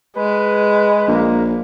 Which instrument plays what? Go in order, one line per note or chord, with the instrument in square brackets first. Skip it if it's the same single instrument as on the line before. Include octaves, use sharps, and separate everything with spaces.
[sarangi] G#3 [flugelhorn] B4
[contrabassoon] A#1 [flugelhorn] A#3